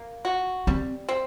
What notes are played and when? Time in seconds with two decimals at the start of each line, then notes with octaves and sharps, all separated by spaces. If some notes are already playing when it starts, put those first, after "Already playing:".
Already playing: A#3
0.25 F#4
0.67 G3 C4
1.09 C4